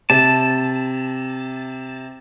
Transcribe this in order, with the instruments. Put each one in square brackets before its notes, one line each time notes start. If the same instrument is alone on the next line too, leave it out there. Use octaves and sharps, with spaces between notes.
[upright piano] C3 [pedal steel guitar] A5